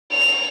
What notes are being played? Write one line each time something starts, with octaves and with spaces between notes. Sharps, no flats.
F7